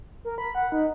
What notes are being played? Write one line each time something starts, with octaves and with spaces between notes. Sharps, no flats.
A#4
B5
F#5
D#4